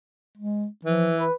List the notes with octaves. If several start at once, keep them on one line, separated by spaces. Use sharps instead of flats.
G#3
E3 F3
B4